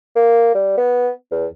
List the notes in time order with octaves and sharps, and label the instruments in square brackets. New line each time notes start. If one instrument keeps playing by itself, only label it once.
[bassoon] A#3
G3
B3
E2